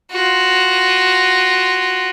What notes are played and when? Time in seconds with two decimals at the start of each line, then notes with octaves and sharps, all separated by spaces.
0.12 F4 F#4